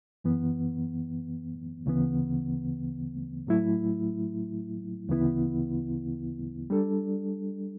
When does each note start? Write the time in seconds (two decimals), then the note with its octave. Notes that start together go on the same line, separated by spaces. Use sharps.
0.24 F#2 E3 B3
1.86 D2 C#3 E3 B3
3.47 A2 F#3 A3 E4
5.09 D2 C#3 E3 B3 E4
6.70 G3 D4 A4